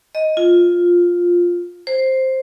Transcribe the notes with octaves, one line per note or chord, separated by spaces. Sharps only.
D#5
F4
C5